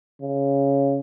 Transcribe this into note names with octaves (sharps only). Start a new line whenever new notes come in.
C#3